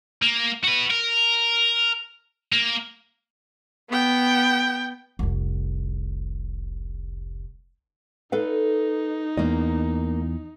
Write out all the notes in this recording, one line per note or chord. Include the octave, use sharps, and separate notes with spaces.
A#3
F#4 B4
A#4
A#3
B3 G5
F1 C2
D#4 A4 B4 F5
E2 A#3 D#5